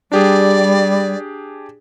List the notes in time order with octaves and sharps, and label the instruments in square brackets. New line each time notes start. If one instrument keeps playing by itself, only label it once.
[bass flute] G3 [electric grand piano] D4 G4 G#4 [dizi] D5